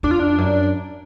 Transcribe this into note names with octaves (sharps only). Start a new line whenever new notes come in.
F2 D4
F4
D4
F#2